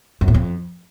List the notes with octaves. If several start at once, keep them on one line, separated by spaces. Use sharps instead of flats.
F#2
A2
F2